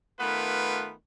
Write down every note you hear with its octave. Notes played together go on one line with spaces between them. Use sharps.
D#3 A3 B3 F4 B4